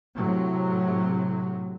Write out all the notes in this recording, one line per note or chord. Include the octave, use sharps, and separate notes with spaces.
A2 C3 F#3